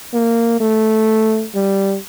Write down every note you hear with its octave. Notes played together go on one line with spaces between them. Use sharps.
A#3
A3
G3